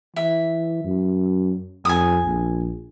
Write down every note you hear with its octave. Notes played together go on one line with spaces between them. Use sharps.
E3 E5
F#2
F2 G#5 D#6
A#1